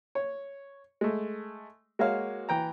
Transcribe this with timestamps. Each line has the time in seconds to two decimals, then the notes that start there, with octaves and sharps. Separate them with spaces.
0.15 C#5
1.01 G#3 A3
1.99 G#3 A#3 F#4 C#5 F5
2.49 E3 G5 A#5